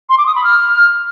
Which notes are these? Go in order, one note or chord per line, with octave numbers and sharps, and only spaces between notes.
C6
D6
D#6
B5
F6